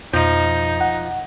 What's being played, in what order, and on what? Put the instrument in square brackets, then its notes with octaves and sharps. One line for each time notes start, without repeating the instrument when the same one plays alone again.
[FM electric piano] F2 B2 G6 [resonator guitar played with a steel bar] F3 [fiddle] D#4
[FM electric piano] F#5